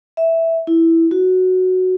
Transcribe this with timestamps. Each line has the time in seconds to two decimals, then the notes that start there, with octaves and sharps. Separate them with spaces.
0.17 E5
0.67 E4
1.11 F#4